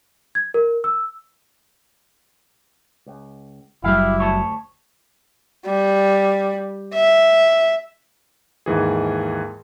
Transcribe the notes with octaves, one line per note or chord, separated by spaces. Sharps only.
G#6
A#4
E6
C#2
F#1 F#3 G3 E4 G4 F5
D2 C#5 A5
G3
E5
D#2 G#2 E3 G#4